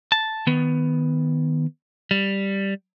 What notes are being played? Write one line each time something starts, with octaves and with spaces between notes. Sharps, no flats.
A5
D#3 B3
G3